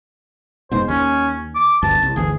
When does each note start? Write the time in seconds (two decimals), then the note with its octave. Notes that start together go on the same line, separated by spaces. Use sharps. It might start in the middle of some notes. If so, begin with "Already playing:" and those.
0.72 F1 G#2 B2 C5
0.89 D#2 C#4
1.55 D6
1.82 G1 D2 G2 A5
2.02 C2
2.16 G1 D2 E3 G#4